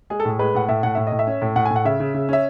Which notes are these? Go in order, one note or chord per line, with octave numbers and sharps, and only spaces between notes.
G#3 G#4
A4
A2 G#4
G#3 B4
A2 F#5
A2 E5
A2 F#5
A2 E5
D#5
A2
E5
C#4
A2
A2 F#5
G#5
A2
F#5
C#3 E5
C#3
C#3
C#4 E5